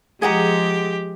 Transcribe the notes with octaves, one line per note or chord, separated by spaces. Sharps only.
F3 G#3 G4 G#4 F#5 A#5